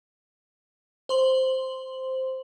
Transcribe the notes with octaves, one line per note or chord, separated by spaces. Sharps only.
C5 C6 F#7